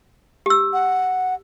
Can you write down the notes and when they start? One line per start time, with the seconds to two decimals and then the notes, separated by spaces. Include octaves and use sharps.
0.46 G4 E6
0.73 F#5